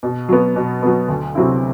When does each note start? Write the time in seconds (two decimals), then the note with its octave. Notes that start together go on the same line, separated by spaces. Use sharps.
0.03 B2
0.29 F#3 B3
0.56 B2
0.82 F#3 B3
1.08 D2
1.35 C3 F#3 C4 E4